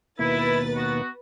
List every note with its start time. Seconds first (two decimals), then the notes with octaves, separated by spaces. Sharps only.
0.19 D#2 B2 A#3 E4 B4 A6
0.75 B3 F#4